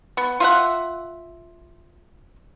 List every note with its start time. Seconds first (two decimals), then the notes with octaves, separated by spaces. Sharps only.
0.17 B3
0.40 F4 E5 F#5